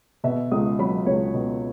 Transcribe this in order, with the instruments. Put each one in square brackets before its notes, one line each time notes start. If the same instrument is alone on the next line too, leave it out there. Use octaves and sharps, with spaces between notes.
[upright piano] B2 E5
C#2 D#6
F#3 B5
C#2 C#5
B2